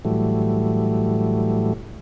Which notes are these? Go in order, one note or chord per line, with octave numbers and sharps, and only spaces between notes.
A2 E3 F#3 G3 A3